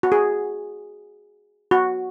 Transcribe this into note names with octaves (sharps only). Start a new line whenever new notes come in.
F#4
G#4
F#4